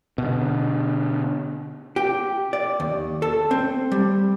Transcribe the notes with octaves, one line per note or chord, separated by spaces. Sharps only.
B2 D3
G4
D5
D#2
A4
C4
G3